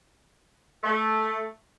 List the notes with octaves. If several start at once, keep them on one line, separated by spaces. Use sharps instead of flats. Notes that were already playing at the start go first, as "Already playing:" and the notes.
A3